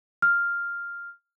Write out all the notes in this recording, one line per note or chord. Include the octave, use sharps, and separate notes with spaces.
F6